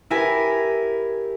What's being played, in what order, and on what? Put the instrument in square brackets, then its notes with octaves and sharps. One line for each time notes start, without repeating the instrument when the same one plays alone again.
[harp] E4 G4 A#4 G#5 B5